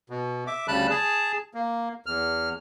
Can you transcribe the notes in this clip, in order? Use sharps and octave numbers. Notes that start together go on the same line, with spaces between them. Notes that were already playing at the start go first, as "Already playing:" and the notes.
B2
E5 D6
D2 C#3 G3 A5 B5 F#6
G#4 A5
A#3
E2 F6